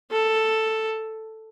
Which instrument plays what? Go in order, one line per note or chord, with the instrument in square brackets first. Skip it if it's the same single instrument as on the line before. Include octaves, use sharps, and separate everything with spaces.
[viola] A4